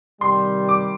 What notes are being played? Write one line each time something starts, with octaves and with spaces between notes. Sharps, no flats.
C3 D#3 G3 C6
D6